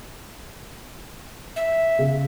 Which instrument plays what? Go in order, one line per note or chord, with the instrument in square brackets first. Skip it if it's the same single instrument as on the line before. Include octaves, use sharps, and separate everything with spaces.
[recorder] E5
[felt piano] C#3